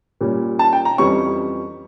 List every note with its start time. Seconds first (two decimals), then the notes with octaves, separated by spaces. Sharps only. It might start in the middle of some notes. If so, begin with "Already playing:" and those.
0.21 A#2 G3 C#4
0.59 A5
0.73 G5
0.85 A#5
0.98 F2 E3 G3 C#4 C#6